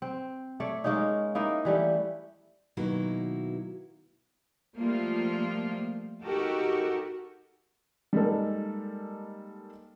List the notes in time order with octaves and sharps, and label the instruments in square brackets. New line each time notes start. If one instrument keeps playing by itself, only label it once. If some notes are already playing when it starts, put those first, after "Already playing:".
[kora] C4
A3 C#5 D5
G#3 A#3 C#4 D#4
A#3 D#4 E4 A#4
E3 G3 A3 E4
[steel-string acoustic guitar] B2 D#3 F#3 A#3 E4 F#4
[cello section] F3 G3 A3 A#3 F4
D#4 F#4 G4 A4 A#4
[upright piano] G3 G#3 A#3 D#4 A4